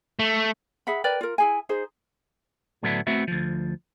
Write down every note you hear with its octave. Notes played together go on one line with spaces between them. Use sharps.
A3
G#4 E5 F#5 B5
A#4 B4 D5 G5
F4 A#4
E4 G#4 G#5
D#4 G#4 C5
A2 D3 F#3 B3 D4 E4
A3 B3 C4 E4 F#4 E5
D2 F3